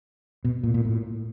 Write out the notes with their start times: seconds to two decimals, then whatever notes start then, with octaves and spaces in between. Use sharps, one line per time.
0.45 B2
0.63 A#2
0.74 A#2
0.85 A2